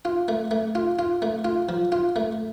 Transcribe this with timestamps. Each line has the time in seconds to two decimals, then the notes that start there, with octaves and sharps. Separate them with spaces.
0.05 F4
0.28 A3
0.51 A3
0.75 F4
0.99 F4
1.22 A3
1.45 F4
1.69 F3
1.92 F4
2.16 A3